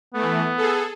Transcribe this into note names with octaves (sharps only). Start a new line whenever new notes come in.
E3 A3 B3
G#4 A4